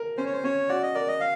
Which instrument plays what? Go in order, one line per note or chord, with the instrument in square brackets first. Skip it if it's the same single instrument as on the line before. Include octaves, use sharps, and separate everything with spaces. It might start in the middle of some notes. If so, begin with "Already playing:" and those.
Already playing: [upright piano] A#4
[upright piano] C#4 [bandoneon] C5
[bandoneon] C#5
C5
[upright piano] C#4 [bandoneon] C#5
[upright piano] F#4 [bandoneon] D5
[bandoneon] D#5
[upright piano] A#4 [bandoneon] D5
[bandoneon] D#5
F5